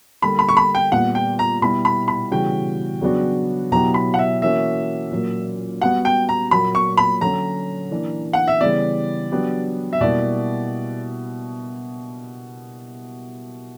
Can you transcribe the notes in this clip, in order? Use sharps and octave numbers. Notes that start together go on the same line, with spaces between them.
D3 G3 A#3 B5
B5
C#6
B5
G5
A#2 G3 B3 F#5
G5
A#5
B2 G3 B3 E4 B5
B5
B5
C#3 E3 G3 B3 F#4 G5
C#3 F#3 B3 D4 F#4
B2 F#3 B3 E4 G4 A#5
B5
F#5
E5
E3 A#3 C#4 F#4 E5
A#2 F#3 A#3
G3 B3 F#4 F#5
G5
A#5
A#2 F#3 A#3 B5
C#6
B5
D3 F#3 C#4 F#4 A#5
E3 A#3 D4
F#5
E5
C#3 E3 G3 B3 D5
F#3 B3 D4 G4
E5
B2 G3 A#3 E4 D5